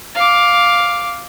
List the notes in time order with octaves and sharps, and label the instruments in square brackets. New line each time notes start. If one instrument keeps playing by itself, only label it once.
[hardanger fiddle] F5 D6